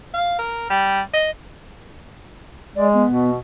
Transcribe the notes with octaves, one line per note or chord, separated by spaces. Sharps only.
F5
A#4
G3
D#5
G#3 D5
B3
B2